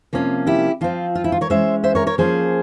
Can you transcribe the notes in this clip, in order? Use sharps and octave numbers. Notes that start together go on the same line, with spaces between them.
C3 F3 A#3 C#4
E4 G4
F3 C4 F4
F4
E4
F4
A#4 C#5
E3 G#3 C#4 C5 E5
C5 E5
A#4 C#5
A#4 C#5
F3 A#3 C#4 G#4 C5